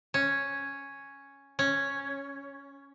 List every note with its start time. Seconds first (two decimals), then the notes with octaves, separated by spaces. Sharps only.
0.14 C#4
1.59 C#4